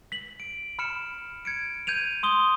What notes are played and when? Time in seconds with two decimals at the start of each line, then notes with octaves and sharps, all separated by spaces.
0.12 B6 F#7
0.40 D7
0.79 B5 F6 C#7 E7
1.45 G#6 C#7 D7
1.87 G6 G#6 D#7 F7
2.23 C6 D#6 G7